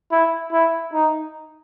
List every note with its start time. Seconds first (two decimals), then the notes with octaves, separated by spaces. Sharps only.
0.11 E4
0.52 E4
0.93 D#4